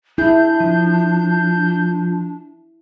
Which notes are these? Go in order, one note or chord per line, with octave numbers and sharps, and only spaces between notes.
D4 E4 G#4 G6
F3